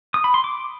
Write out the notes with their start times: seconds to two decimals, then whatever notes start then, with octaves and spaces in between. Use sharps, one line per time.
0.14 D#6
0.24 B5
0.34 C6
0.44 D6